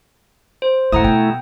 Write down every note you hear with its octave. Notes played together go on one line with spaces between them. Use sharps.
C5
D2 A2 A3 E4 F#5 A#5 D#6
B2 G5